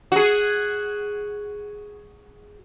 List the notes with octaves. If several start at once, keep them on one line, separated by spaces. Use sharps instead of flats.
F#4 G#4